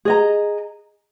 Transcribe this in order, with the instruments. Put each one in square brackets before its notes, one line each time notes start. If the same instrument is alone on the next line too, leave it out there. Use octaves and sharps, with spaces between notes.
[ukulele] G#4 D#5 A#5